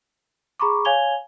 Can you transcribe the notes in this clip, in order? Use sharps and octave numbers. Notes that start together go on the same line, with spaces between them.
G#4 A#5 B5 C#6 D6
C#5 F5 G#5 G#6 F7 G7